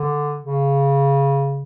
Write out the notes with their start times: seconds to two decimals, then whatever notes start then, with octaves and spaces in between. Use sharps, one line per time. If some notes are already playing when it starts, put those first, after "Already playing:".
Already playing: D3
0.44 C#3